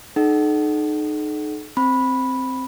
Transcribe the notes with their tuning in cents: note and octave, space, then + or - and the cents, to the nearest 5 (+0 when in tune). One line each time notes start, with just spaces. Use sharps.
D#4 -30 A4 -40 F#5 +25
C4 +0 B5 -5